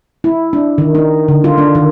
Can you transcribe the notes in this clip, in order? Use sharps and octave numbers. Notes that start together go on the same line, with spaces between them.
E4
D4
D#3
D#4
D3
F4
D4
D#3